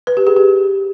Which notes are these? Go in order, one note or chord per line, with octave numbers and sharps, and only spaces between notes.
B4
G4
G#4
G4